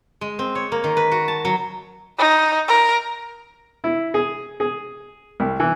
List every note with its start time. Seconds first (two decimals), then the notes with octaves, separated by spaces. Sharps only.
0.21 G#3
0.39 C4
0.55 C#5
0.72 A#3
0.84 D#3
0.97 B4
1.11 F#4
1.28 A5
1.45 F#3
2.18 D#4
2.68 A#4
3.84 E4
4.14 G#4
4.60 G#4
5.40 C2
5.60 E3